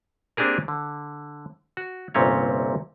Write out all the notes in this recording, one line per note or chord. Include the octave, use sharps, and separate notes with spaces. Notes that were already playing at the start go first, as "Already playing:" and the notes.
A#3 C4 D4 G4 G#4 A#4
D3
F#4
G1 C2 A#2 C4 C#4 C#5